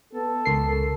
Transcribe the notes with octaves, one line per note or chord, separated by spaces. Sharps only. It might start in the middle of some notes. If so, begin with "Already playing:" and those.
B3 A4
C#2 A#4 C7